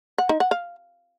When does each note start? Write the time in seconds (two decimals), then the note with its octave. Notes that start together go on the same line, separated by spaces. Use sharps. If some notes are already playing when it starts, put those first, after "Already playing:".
0.18 F#5
0.29 D#4
0.40 F#5
0.51 F5